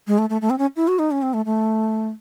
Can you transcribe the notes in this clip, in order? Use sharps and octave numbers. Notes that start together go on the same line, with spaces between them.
G#3
A3
A3
A3
C4
C#4
E4
F#4
D#4
C#4
C4
A3
A3